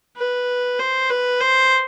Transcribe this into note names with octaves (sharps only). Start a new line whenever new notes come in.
B4
C5
B4
C5